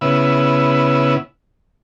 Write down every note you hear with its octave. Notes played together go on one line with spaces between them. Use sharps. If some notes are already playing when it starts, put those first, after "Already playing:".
C#3 B3 E4